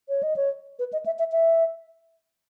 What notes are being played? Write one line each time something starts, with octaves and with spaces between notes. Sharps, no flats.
C#5
D#5
C#5
B4
D#5
E5
E5
E5